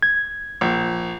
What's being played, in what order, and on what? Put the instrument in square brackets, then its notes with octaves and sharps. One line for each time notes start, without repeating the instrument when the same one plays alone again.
[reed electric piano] G#6
[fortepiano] A#1